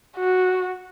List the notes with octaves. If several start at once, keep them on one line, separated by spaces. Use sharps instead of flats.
F#4